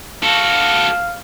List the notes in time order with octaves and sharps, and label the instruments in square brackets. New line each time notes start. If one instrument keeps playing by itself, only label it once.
[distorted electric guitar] F#4 A4 [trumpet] F5